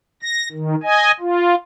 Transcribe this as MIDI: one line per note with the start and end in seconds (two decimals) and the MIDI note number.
0.22 0.48 94
0.52 0.75 51
0.83 1.11 75
0.83 1.11 80
1.20 1.55 65